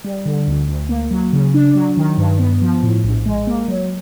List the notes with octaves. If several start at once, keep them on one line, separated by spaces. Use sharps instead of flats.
G3
D3
D2
D2
A#3
F#3
C#3
D4
F#3
D#3
G2
B3
F3
A2
A#1
G#3
A#3
F#3